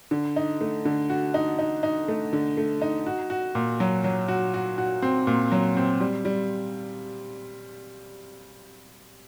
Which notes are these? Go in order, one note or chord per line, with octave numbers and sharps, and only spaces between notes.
D3
D#4
A3
D3
F#4
D#4
D#4
D#4
A3
D3
A3
D#4
F#4
F#4
A#2
F#3
F#3
F#4
F#4
F#4
C4
A#2
F#3
C4
G3
G3